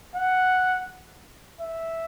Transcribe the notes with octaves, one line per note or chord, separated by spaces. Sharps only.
F#5
E5